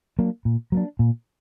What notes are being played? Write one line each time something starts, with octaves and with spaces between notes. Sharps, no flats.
F#3 A#3 D4
A#2
F#3 A#3 D4
A#2